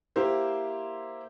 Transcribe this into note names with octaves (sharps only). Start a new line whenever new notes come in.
A#3 E4 G4 C5